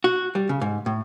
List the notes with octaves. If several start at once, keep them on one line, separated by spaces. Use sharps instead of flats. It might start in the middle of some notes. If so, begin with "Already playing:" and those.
F#4
G3
C#3
G#2
A2